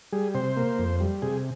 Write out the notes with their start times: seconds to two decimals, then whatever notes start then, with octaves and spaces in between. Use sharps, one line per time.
0.13 G3 G#4
0.35 C3 C5
0.57 A#3
0.79 F2
1.00 G3
1.22 C3 G#4